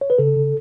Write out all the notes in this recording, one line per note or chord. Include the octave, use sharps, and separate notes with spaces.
C#5
B4
C#3 A4
C#3